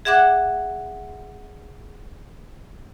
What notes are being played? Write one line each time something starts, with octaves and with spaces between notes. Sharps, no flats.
G#4 E5 F#5 D6 F#6